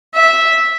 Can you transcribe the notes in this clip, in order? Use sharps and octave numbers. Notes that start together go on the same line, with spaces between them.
E5